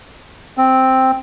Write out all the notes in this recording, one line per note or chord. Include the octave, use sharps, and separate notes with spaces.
C4